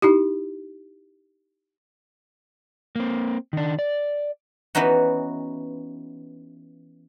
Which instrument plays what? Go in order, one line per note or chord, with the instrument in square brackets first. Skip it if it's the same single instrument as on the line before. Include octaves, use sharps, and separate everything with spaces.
[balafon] D#4 E4 G4
[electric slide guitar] A#3 C4
D#3 D4
D5
[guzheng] E3 B3 C#4 D#4 F#4